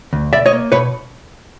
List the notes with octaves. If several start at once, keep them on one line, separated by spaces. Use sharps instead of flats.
D2
B2 D5 E5
C#5 D#5
A#3
B2 B4 C#5